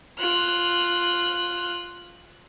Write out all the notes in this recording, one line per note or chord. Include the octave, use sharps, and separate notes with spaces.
F4 F#6